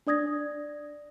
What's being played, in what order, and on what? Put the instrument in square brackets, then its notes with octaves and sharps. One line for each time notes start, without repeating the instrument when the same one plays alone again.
[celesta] D4 D5 D#6 G#6 A#6